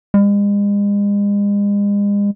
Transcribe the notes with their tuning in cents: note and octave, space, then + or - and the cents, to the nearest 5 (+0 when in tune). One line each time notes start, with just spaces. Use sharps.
G#3 -40